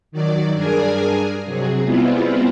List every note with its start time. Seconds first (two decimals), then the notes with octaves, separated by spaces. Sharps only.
0.12 D#3 F#3 D5
0.53 G2 D4 G#4 A#4 G#5
1.45 C3 F#3 G#4
1.83 G3 G#3 B3 C4 E4 F4